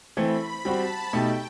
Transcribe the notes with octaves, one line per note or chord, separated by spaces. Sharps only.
E3 A3 C4 B5
G3 C4 F#4 A5
B2 A3 D#4 G4 G5